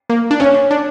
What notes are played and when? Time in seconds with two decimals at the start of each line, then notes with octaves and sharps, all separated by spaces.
0.10 A#3
0.31 D4
0.40 C#4 C#5
0.71 D4